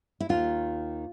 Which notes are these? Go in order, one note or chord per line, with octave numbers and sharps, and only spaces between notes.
E4
D#2 D#3 F4